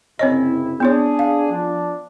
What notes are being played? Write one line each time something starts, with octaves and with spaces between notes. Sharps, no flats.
F#1 C3 C4 E4 C#5 D#5
B3 D4 E4 G#4 C#5
F5
F3 D4